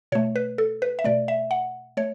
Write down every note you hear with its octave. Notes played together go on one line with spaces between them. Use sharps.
B2 A3 C#5
B4
A4
B4
E5
B2 A3 D5
E5
F#5
A3 C#5